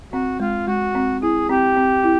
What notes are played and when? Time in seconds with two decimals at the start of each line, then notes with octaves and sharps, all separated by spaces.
0.13 C4 F#4
0.40 G#3 F4
0.67 G#3 F#4
0.95 C4
1.22 E4 G#4
1.50 C4 G4
1.77 C4
2.04 E4